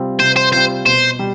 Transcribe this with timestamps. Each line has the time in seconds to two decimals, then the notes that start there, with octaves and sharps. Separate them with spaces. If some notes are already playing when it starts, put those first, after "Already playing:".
Already playing: C3 G3 C4 F4
0.20 C3 C5
0.37 C5
0.53 G3 C4 F4 C5
0.86 B2 C5
1.19 G3